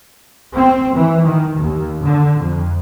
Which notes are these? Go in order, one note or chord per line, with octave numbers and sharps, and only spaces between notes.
C4
E3
D#3
D#2
D3
F2